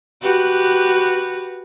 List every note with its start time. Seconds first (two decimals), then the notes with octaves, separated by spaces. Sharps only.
0.22 F#4 G4 B4